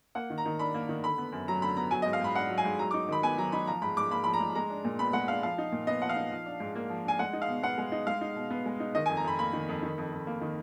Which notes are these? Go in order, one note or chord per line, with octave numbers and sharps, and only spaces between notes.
A#3 F#5
D#3
A#5
D#3
D4 B5
A#3
D#3
D3 B5
B3
F#2
F#3 A#5
D3 B5
B3 A#5
F#3 G#5
D#5
G#2
F5
G#2 B5
D4 F#5
F#3
G#5
G#2
F#3 A#5
D6
D#4
D#3 B5
B3 G#5
F#3 A#5
D#4 B5
F3 A#5
G#2 B5
G#2 D6
A#3 B5
F3 B5
A#5
G#2
G#3 A#5
D4
A#2
B3 B5
G#3 F#5
D4 F5
F3 F5
D#4
A#2
B3 D#5
F3 F#5
F5
D#4
F3
D4
G#2
A#3
F3
D4 G#5
G#3 F#5
D#4
F5
B2
B3 F#5
G#3
D#4
G#3 F5
D#4
B2
B3
G#3
D#4
D#3 D#5
G#5
F2
A#5
F2 B5
A#3 B5
D#3
F2
D#3
F2
F2
A#3
D#3